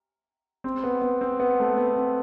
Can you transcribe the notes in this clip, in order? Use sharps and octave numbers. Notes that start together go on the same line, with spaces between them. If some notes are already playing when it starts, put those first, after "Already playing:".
C4
B3
B3
C4
B3
A3
B3
C4